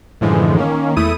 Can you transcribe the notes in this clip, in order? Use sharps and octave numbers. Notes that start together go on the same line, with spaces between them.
F#2 A2 D3 E3 F3 G#3
D#3 A#3 C#4
E2 A3 E4 D#6 D#7